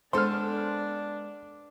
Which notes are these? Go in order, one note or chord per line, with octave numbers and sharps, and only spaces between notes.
G#3 B3 D4 A4 C5 D5 C6 F6